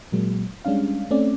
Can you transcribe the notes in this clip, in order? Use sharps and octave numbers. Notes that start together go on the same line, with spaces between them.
A#2 F#3 G#3 A#3
G3 G#3 C#4 D4 F5
A3 C4 C#4 D5